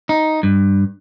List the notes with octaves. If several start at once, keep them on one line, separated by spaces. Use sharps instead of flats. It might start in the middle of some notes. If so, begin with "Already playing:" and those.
D#4
G2